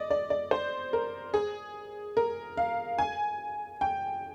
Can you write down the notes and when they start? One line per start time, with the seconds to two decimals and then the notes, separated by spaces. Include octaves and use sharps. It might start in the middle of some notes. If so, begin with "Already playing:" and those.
Already playing: D5 D#5
0.11 D5
0.30 D5
0.51 C5
0.93 A#4
1.34 G#4
2.17 A#4
2.57 F5
2.98 G#5
3.81 G5